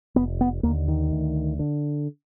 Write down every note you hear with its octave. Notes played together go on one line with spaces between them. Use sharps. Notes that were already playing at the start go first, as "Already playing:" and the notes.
F1 B3
B3
D#2 D3 A#3
D#3
D2
D3